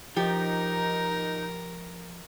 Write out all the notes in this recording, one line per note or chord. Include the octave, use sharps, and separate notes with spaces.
F3 D#4 G4 A#4